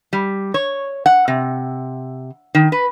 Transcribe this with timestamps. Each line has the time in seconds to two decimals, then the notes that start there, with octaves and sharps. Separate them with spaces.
0.13 G3
0.54 C#5
1.06 F#5
1.28 C3
2.55 D#3
2.72 B4